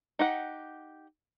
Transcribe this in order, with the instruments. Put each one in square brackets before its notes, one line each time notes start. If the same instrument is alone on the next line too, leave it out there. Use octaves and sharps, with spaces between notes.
[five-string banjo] D#4 G4 F#5